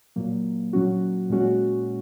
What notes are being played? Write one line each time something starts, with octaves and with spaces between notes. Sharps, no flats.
A#2 F#3 A#3
A#2 F#3 C#4 F#4
A#2 G#3 C#4 F#4